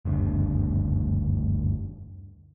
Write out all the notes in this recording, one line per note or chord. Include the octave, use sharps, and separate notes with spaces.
F#1 D2 G2